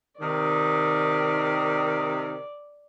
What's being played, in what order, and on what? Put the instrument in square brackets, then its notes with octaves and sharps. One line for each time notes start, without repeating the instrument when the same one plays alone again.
[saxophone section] C3 D#3 [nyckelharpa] D5